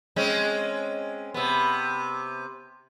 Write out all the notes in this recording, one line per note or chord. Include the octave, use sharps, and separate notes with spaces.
G#3 C4 C#4
C3 B3